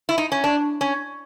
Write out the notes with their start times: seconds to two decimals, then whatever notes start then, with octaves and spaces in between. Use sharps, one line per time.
0.09 E4
0.18 D#4
0.32 C#4
0.44 D4
0.81 C#4